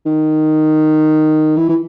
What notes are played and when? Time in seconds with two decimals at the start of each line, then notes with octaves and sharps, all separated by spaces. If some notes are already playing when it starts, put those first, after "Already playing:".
0.06 D#3
1.57 E3
1.69 E3